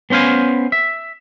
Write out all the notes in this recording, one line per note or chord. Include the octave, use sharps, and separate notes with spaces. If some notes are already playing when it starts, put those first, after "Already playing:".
B3 C#4 C5 F5 G#5
E5